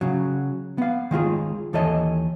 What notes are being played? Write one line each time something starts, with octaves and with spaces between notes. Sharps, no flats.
C#3 F#3
B3 F5
D#3 G#3 F4 G#4
D#2 E3 A4 C#5 D#5 A5